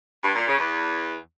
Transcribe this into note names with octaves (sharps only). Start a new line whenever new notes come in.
G2
A#2
C#3
E2